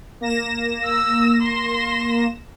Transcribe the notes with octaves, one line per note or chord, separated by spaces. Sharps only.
A#3 A#6 E7
E6
C6